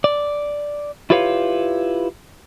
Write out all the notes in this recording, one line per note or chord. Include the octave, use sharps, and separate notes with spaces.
D5
E4 F4 G4 B4 C#5 F5